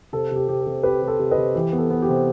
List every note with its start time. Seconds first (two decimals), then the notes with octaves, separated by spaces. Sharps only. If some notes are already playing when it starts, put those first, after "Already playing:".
0.13 C3 A4
0.31 C3 G4
0.48 C3 G4
0.61 A4
0.67 C3
0.83 C4 G4 B4
1.02 C3
1.08 A4 C5
1.19 C3
1.31 B4 D#5
1.37 C3
1.55 E3 G4
1.73 B3
1.78 A4
1.91 B3
2.02 G4
2.09 C3